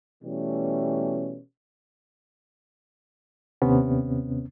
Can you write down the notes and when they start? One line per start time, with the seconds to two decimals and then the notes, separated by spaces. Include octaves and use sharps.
0.24 B2 E3 G3 A3 C#4
3.62 D#2 C3 B3 C#4